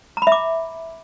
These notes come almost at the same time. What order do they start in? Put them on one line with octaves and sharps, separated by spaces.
A#5 B5 E5 D6